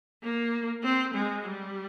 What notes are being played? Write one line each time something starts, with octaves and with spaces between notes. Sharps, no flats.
A#3
C4
G#3
G3